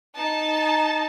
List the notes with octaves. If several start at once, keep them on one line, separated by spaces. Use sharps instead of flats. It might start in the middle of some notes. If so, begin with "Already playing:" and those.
D#4 A5